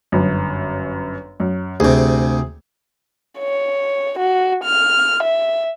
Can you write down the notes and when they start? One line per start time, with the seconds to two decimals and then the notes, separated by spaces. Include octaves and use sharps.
0.12 G1 F#2
1.40 F#2
1.80 D2 C3 G#4
3.39 C#5
4.19 F#4
4.63 F6
5.23 E5